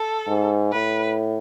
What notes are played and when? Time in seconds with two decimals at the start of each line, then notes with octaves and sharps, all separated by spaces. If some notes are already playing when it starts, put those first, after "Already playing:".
Already playing: A4
0.27 G#2
0.73 A2 B4